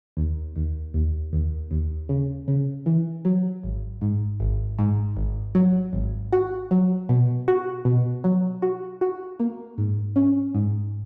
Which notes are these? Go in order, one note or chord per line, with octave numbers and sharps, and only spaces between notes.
D#2
D#2
D#2
D#2
D#2
C#3
C#3
E3
F#3
G#1
G#2
G#1
G#2
G#1
F#3
G#1
F#4
F#3
B2
F#4
B2
F#3
F#4
F#4
A#3
G#2
C#4
G#2